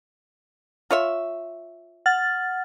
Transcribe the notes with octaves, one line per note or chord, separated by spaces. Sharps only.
F4 C#5 E5
F#5 F6 A6